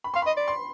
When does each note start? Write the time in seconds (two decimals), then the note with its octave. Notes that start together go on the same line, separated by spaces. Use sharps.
0.04 B5
0.14 F5 C6
0.22 D#5 B5
0.37 D5
0.48 C6